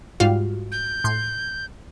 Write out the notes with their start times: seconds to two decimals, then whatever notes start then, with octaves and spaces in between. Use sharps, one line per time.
0.20 G#2 G3 F4 F#4 F5
0.72 G6
1.04 A2 C6